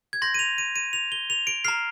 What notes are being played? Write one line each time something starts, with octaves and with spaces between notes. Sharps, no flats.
G#6
C6 G6 A#6
D#7
F7
D#7
D#7
F7
G7
F7
D7
A#5 F6 C7